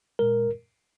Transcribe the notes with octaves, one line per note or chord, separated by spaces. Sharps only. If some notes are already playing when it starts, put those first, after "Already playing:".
A#2 G#3 A#4